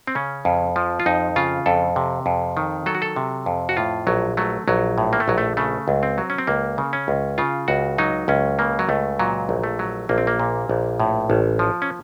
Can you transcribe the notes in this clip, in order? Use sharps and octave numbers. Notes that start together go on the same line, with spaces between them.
C4
C#3 C#4
F2
F3
F4
F2 D#4
C#3 F4
F2 A4
C3
F2
D#3
F#3 A4
F#4
A4
C3
F2
F#4
A2 F4
A#1 F#3
F#3 A3
A#1 F#3
A2
A#3
A3
A#1 F#3
A3
C#3 A3
C#2
C4
F#3
C#4
C4
C#2 A#3
C#3
C#4
C#2
C#3 F4
C#2 F#4
F#3 D#4
C#2 C#4
C#3 A#3
F#3
C#2 A3
A#2 F#3
A#1
A3
F#3
A#1 A#3
C4
A#3
A#2
A#1
A2
A1
F3
C#4